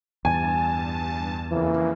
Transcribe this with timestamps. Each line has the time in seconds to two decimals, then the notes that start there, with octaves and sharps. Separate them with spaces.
0.25 E2 G2 G#5 A5
1.51 F2 C#3 E3 A#3